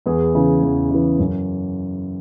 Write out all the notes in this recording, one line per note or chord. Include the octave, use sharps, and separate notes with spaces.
E2 G#4 B4
C#3 E3
E2
C#3 E3
F#2